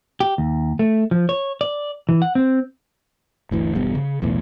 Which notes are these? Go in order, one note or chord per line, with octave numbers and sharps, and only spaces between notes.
G4
D#2
A3
F3
C#5
D5
E3
F#5
C4
G1 D2 E3
E1 G2 G3 B3
C#3
B1 E2 A2